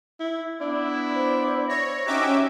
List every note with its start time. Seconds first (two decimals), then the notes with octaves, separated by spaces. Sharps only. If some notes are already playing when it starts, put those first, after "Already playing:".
0.20 E4
0.61 B3 D4 E4
1.15 C5
1.69 C#5 A#6
2.07 C#4 D#4 F#4 G4 C#5 E5 D6